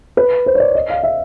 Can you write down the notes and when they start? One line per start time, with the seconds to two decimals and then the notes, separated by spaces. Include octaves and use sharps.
0.17 B4
0.46 C5
0.55 C#5
0.60 D5
0.75 D#5
0.90 F5
1.03 E5